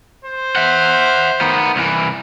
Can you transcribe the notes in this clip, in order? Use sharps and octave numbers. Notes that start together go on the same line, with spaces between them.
C5
E5 F#5
D#3 B3
C2 E3